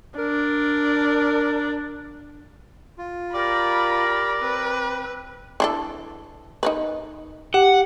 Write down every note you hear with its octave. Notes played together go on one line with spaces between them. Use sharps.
D4 A#4
F4
G4 A#4 D5 B5
C4 B4
E3 D4 A4
D#4 A#4 B4
G4 F#5